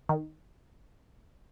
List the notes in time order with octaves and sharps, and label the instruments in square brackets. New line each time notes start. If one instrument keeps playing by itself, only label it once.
[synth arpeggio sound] D#3